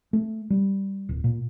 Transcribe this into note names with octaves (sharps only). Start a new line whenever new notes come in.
A3
G3
D1
A#2